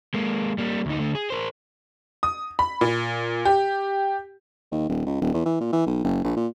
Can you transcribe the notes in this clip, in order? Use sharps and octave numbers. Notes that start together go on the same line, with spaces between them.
G#3 A#3
G3 A#3
D2 D#4
D3 A3
G#4
A#4 C5
D#6
B5
A#2
G4
D#2
D#1
C#2
D#1
E2
E3
A#2
E3
B1
F#1
A#1
A#2